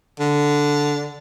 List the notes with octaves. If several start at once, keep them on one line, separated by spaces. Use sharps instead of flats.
D3